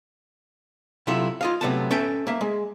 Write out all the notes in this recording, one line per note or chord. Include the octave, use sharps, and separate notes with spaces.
C3 F#3 E4 F4 A4
F4 D#5 F5
C3 F3 F#3 A3 B3 A5
C#4 A4 E5 G5
A#3 E5
G#3